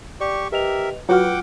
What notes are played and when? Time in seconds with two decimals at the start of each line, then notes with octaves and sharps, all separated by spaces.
0.21 G4 D5 C#6
0.52 G4 A#4 B4 D#5 E5 F7
1.09 F#3 F4 F#4 B4 F#5 G5 D6 F6